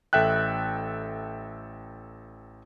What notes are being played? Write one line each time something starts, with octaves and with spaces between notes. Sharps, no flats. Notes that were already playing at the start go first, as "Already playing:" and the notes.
A1 A4 E5 G5 F#6